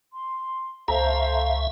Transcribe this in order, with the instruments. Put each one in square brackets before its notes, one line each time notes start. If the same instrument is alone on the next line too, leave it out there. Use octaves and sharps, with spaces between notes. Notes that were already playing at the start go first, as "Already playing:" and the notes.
[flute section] C6
[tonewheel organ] C#2 E5 [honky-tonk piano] A4 A#5 [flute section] C5 F5